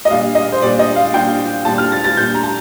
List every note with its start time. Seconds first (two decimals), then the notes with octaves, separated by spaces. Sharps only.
0.05 D#5
0.10 A#2 G3 D4 F5
0.35 D#5
0.52 C5
0.62 A#2 G3 D4 D5
0.79 D#5
0.96 F5
1.14 A#2 G3 D4 G5
1.65 A#2 G3 D4 A5
1.78 F6
1.92 A6
2.04 A6
2.17 A#2 G3 D4 G6
2.34 A#5
2.43 A5